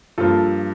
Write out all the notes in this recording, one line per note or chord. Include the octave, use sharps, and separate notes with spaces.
G2 F3 A#3 F4 A4